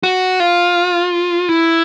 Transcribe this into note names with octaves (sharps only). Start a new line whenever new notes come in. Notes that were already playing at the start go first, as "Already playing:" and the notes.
F#4
F4
E4